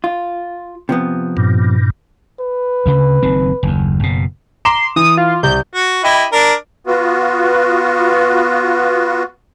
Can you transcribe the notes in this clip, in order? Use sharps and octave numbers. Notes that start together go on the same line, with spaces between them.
F4
C3 F3 B3
G2 A#2
B4
D2 C#3
F#1 D#3 C4
F#1 D#2
F#1 B2
A#5 C6 D6 E7
E3 D#6
F4
C2 G6
F#4
E4 G4 D#5
D4 A#4
B3 F4 F#4